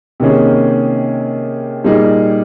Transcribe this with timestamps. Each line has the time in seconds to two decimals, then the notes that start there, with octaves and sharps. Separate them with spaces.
0.20 C3 D#3 A#3 C#4 G#4
1.84 A#2 G3 A#3 D#4 G#4